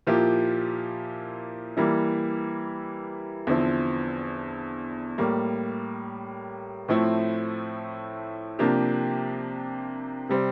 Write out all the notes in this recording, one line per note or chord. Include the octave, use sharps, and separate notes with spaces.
A#2 F3 A#3 E4 G4
E3 G3 A#3 E4
E2 D3 F3 C4 E4
A2 G3 A#3
A2 F3 A3 C4 E4
C3 F3 A#3 D4 G4
C3 G3 C4